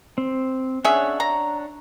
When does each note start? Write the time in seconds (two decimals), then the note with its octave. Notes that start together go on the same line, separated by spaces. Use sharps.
0.18 C4
0.84 C#4 D4 G#4 C#5 E5 F#5
1.20 A#5